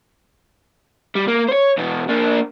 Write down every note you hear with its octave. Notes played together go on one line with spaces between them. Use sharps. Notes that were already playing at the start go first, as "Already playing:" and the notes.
G3
A#3
C5 C#5
E2 B2
A#3 D4